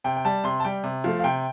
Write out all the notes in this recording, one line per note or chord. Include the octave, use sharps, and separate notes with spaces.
C3 G5
G5
G3 A5
C3 C6
A5
G3 G5
C3
F3 A3 F5
F5
C3 G5